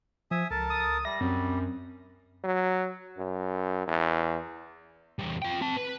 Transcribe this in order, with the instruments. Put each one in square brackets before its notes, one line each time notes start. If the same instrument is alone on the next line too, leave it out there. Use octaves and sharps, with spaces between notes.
[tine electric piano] F3 [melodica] E5 G#5 D#6
[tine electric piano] C#2 [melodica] A4 A#4 A5
[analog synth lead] D#6
[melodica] G3 [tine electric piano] E5 [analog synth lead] A#6
[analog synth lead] F#2 [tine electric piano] C4
[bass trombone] F#3
F#2
E2
[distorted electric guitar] E2 G3
F4 G5
C4 A5
B4